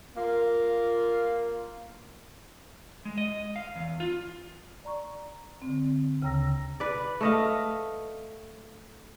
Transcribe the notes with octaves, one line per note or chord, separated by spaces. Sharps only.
A#3 F4
G#3
D#5
F5
E2
F4
D5 A#5 C#6
D3 C4
D2 C#3 G5 A#5 E6 A#6
B4 D5
A3 D#5 F5